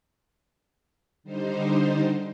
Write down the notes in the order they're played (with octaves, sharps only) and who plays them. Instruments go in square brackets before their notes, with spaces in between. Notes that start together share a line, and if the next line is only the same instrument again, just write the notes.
[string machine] D3 G3 D#4 C5